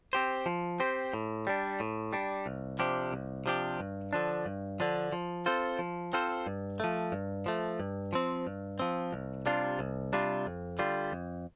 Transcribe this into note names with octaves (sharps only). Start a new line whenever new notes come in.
C4 G4 C5
F3
C4 G4 C5
A2
G3 D4
A2
G3 D4
C2
C3 F3 D4 G4
C2
C3 F3 D4 G4
G2
D3 F3 D4
G2
D3 F3 D4
F3
C4 F4 A4 C5
F3
C4 F4 A4 C5
G2
F3 A3
G2
F3 A3
G2
F3 C4
G2
F3 C4
C2
C3 G3 D4 F4
C2
C3 G3 D4 F4
F2
D3 G3 F4
F2